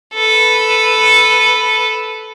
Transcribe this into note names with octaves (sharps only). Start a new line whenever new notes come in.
A4 B4